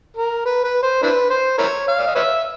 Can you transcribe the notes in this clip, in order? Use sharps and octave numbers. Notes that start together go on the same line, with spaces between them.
A#4
B4
B4
C5
D4 E4 B4
C5
E4 A#4 C#5
F5
D5
D#5
B4 C#5 E5